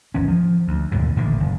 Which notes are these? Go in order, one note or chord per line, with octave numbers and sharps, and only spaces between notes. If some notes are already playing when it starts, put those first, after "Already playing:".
G#1 E2 C#4
F3
D2
D#2 G#2 B2 D3
A1 A#2 D3 D#3
F#1